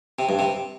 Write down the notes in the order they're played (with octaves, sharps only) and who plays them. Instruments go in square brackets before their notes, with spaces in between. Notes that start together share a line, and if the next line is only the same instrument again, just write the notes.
[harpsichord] C3
G2
C3